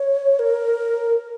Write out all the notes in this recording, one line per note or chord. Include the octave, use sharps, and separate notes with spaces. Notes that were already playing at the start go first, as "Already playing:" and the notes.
Already playing: C#5
A#4